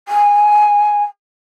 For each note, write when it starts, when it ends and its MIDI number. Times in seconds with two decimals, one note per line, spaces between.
0.08 1.04 80